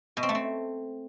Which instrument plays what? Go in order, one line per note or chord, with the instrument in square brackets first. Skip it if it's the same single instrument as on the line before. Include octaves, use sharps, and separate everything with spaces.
[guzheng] B2
C4
A3
C4